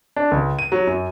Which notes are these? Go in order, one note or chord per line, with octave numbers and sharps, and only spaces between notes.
D4
C#2
D#7
F#3
F#2